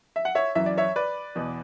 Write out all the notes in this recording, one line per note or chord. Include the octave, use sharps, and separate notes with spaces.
E5
F#5
C#5 E5
F#2 E3 E5
D5
C#5 E5
B4 D5
E2 B2